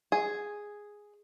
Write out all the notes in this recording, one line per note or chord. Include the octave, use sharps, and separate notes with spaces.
G#4